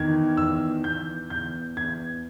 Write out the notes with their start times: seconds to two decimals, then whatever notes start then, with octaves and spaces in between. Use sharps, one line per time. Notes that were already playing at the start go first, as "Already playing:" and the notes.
Already playing: E2 D#3 G#6
0.37 E2 E6
0.84 E2 G6
1.30 E2 G6
1.77 E2 G#6